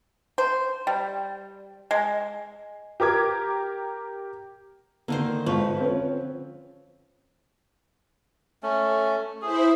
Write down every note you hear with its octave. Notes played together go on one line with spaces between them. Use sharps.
C5
G3
G#3
G4 A#4 D6 G#6
D3 D#3 A#3 C5
G#1 F3 B4 C#6
C4 C#4
A3 C#4
E4 G#4 C5 B5